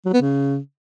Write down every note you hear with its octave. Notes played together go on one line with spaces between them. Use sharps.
F#3
B3
C#3